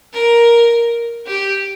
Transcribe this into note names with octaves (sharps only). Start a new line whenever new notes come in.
A#4
G4